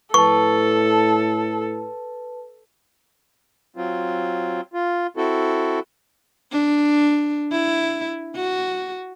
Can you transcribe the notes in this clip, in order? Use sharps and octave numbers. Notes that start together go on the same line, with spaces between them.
A2 A4 B4 A5 C#6
F#3 C4 F4
F4
C4 E4 F#4 A4
D4
E4
F#4